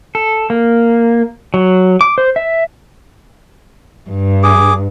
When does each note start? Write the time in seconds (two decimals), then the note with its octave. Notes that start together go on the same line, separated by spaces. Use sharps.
0.15 A4
0.50 A#3
1.54 F#3
2.01 D6
2.18 C5
2.36 E5
4.10 G2
4.43 G#4 D6